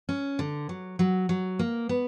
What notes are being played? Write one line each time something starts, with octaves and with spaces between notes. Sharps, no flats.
C#4
D3
F#3
F#3
F#3
A#3
B3